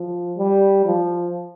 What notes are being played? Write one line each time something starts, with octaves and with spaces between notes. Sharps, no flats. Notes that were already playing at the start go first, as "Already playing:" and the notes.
Already playing: F3
G3
F3